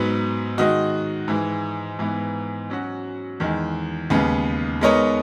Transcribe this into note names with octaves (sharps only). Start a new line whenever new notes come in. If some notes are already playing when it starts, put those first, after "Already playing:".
Already playing: G#2 F#3 B3
D#3 G#3 D#4 F#4
G#2 E3 G#3
G#2 E3 B3
F#3 C#4 F#4
E2 D#3 G#3
D#2 C#3 G#3 B3
G#3 B3 D#4 A#4 C#5